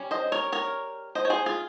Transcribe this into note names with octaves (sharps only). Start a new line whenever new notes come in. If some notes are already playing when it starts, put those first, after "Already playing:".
Already playing: G3 C#4
C5 D#5
A#4 C#5
A#4 C#5
C5 D#5
C#5
G#4 C5
F4 G#4